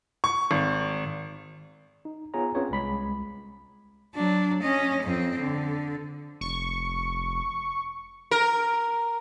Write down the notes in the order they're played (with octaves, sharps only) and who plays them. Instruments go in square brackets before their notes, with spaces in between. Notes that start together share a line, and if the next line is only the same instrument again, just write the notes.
[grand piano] C#6
G#1
[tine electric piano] D#4
B3 F4 G#4 C#5 G#5 A#5
C4 C#4 F4 G#4 B4 C#5
C2 G#3 B5 B6
[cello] F#3 D4
C#4 D#5
F2 C4
D3
[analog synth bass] F1 [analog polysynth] C#6
[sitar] A#4